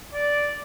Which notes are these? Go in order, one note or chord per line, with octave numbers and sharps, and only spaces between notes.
D5